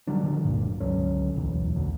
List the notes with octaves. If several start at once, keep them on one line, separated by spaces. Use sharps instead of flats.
D3 F#3 G3 D4
D3 D#3 F3 F#3
D1 G#1 G2 A#2
C#2 D3 F#3 C#4
D1 B1 E2
D2